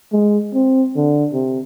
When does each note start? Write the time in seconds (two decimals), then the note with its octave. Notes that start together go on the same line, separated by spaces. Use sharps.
0.12 G#3
0.54 C4
0.96 D3
1.33 C3